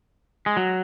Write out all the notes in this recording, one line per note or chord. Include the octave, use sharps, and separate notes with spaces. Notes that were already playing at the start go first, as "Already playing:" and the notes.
G#3
F#3